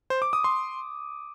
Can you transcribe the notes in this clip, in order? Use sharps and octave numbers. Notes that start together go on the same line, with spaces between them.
C5
D6
D#6
C6